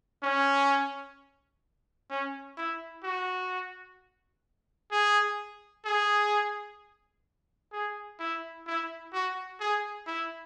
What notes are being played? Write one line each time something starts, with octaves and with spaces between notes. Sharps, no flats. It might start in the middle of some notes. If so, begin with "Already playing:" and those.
C#4
C#4
E4
F#4
G#4
G#4
G#4
E4
E4
F#4
G#4
E4